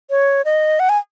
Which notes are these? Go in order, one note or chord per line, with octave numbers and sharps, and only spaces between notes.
C#5
D#5
F#5
G#5